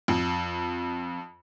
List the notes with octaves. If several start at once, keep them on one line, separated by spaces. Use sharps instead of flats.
F2